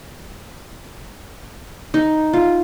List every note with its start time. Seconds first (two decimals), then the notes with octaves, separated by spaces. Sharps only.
1.94 D#4
2.33 F4